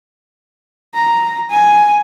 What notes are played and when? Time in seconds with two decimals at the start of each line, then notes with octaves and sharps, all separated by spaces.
0.94 A#5
1.50 G#5